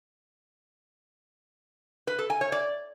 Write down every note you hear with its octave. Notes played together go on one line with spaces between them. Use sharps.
B4
A4
G#5
C#5
D5